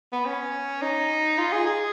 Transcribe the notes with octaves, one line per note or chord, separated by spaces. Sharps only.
B3
C#4
D#4
F4
G#4
G#4